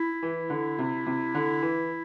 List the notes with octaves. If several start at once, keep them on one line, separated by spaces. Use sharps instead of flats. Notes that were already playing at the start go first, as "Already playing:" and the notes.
Already playing: E4
E3
D3
C3
C3
D3
E3